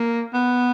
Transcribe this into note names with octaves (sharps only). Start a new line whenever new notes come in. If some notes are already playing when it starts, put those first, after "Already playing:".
Already playing: A#3
B3